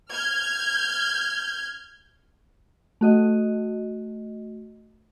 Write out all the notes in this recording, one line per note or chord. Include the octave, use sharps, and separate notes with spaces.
F6 G6 G#6
A3 F#4 D#5